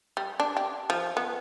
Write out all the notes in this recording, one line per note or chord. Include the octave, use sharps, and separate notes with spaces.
G3
D4
G4
F3
B3